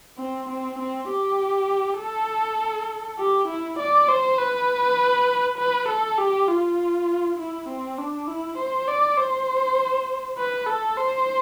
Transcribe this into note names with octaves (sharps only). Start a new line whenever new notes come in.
C4
C4
C4
G4
A4
G4
E4
D5
C5
B4
B4
A4
G4
F4
E4
C4
D4
E4
C5
D5
C5
B4
A4
C5